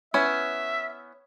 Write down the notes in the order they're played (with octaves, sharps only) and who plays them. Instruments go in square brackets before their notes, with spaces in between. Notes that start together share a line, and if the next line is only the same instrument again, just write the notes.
[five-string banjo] B3 C#4 E4 [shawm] E5